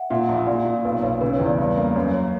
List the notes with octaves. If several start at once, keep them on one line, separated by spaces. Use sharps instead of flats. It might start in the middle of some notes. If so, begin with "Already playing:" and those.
Already playing: E5 F#5
A#2 E5
A#1
A#2 D5
A#2
B1 B4
B1 C#5
C#3 B4
C#5
E2
D5
G2
A#3
F#2 C#5
C#5